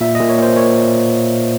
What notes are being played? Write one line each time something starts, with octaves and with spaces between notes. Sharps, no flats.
A#2 E5
D#5
A#2
C#5
A#2 C5
A#2 C#5